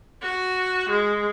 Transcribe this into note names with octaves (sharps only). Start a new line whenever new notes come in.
F#4
G#3